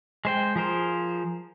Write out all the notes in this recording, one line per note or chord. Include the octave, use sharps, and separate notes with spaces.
G#3 C5 G5
F3 G#4 A#4 C5